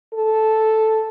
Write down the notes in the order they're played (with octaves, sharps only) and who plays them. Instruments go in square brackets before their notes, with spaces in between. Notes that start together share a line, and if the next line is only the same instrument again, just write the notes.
[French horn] A4